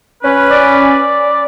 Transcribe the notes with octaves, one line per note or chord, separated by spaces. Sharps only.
C#4 B4
D5